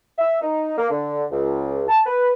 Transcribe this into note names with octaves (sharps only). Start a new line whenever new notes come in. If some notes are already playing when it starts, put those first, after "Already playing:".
E5
D#4
A#3
D3
C#2
A5
B4